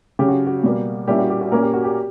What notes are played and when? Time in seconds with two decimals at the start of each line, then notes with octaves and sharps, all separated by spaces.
0.19 C#3 F#3 C#4 G4
0.28 F#4
0.47 F#4
0.63 B2 G3 A#3
1.08 A#2 G3 A#3 C#4 E4 G4
1.19 F#4
1.30 G4
1.41 F#4
1.52 A#2 A#3 C#4 A#4
1.63 G4
1.73 F#4
1.84 G4